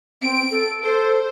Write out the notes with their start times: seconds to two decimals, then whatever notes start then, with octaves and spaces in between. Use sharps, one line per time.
0.22 C4 D7
0.51 A4
0.84 A4 C5